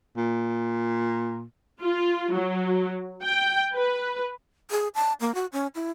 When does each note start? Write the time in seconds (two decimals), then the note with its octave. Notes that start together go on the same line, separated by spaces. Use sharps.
0.17 A#2
1.82 F4
2.33 F#3
3.23 G5
3.75 B4
4.71 G#4
4.95 A5
5.20 A#3
5.35 F#4
5.53 C#4
5.75 E4